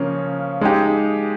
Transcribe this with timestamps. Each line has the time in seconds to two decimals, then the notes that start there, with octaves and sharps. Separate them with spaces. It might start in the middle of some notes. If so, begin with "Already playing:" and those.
Already playing: C#3 F3 A#3 C#4
0.61 G#3 D#4 G4